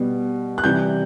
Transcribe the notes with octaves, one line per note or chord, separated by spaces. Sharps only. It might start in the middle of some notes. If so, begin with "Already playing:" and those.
Already playing: B2 G3 B3
F#6
C3 E3 G3 G6